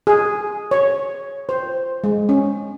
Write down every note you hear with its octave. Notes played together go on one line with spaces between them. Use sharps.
G#4
C#5
C5
G#3
C#4